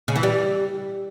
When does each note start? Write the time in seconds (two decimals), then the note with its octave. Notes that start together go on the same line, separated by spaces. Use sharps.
0.08 C#3
0.16 E3
0.23 G3